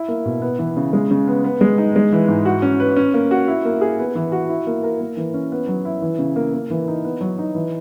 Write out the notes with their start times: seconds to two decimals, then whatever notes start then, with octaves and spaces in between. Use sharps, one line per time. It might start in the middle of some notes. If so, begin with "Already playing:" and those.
Already playing: E4
0.08 A#3
0.25 B2
0.42 B3
0.59 E3
0.77 C#3
0.93 G#3
1.11 C#3
1.28 B3
1.44 B3
1.61 G#3
1.78 D#4
1.96 G#3
2.13 E3
2.28 G#2
2.45 F#4
2.62 C#4
2.80 B4
2.97 C#4
3.14 A#3
3.31 F#4
3.48 E4
3.65 A#3
3.81 G#4
3.99 B3
4.15 E3
4.32 F#4
4.49 E4
4.67 A#3
4.83 A#4
5.01 A#3
5.17 E3
5.34 C#4
5.52 B3
5.68 F#3
5.85 E4
6.02 E3
6.19 C#3
6.36 A#3
6.54 A#3
6.70 E3
6.88 D#4
7.05 B3
7.21 F#3
7.39 D#4
7.55 E3